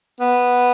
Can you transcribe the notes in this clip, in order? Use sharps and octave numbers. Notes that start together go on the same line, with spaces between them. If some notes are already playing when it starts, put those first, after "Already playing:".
B3